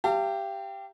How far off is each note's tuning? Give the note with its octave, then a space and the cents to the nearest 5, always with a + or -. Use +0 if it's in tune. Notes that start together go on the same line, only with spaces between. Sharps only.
G4 +0 F5 -40 A5 +45